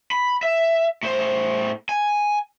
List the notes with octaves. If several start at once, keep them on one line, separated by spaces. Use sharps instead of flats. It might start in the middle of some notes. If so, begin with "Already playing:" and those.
B5
E5
A2 C5
G#5